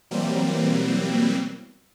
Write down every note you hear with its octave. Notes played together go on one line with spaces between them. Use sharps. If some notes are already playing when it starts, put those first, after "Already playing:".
B2 E3 F#3 G3 A#3 C4